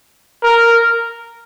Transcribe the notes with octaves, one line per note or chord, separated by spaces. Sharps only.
A#4